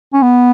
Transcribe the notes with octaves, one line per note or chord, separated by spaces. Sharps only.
C#4
B3